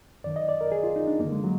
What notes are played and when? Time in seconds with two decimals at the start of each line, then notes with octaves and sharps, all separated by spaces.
0.24 F#2 D#3 D5
0.36 D#5
0.49 D5
0.61 A#4
0.72 G#4
0.84 F4
0.96 D#4
1.07 D4
1.19 F#2 D3 A#3
1.32 G#3
1.44 F#3